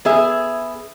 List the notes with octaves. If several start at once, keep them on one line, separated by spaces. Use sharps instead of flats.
B3 G#4 E5